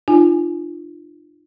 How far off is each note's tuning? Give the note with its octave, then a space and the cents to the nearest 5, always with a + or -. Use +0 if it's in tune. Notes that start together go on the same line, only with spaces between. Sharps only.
D4 +40 F4 -20 G#5 +0